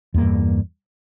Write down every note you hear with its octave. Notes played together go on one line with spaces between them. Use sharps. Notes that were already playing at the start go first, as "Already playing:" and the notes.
E2 G2 A#3